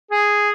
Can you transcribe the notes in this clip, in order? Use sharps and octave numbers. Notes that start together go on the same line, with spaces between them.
G#4